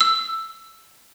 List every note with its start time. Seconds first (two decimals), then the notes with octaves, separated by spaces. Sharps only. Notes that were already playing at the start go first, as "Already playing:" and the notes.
0.01 E6